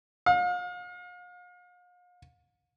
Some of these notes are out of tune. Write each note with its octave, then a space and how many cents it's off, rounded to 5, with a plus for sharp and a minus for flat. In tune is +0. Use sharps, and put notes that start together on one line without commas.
F5 +40